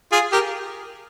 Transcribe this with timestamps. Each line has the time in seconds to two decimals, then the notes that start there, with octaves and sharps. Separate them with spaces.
0.12 F4 G#4
0.32 G4 A#4